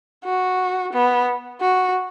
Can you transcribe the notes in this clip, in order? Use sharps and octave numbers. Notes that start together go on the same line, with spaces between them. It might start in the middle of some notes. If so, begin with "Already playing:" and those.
F#4
B3
F#4